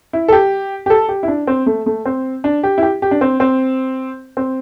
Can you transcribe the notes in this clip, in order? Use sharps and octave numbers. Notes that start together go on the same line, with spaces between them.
E4
A4
G4
G4
A4
G4
E4
D4
C4
A3
A3
C4
D4
G4
E4
G4
G4
D4
C4
C4
C4